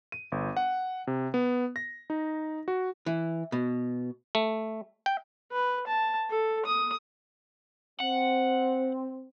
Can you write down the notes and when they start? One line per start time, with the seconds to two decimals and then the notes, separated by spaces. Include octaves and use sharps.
0.12 D#7
0.32 G1
0.57 F#5
1.07 C3
1.34 B3
1.76 A#6
2.10 D#4
2.68 F#4
3.06 E3
3.52 B2
4.35 A3
5.06 G5
5.52 B4
5.87 A5
6.30 A4
6.65 D#6
8.00 C4 F#5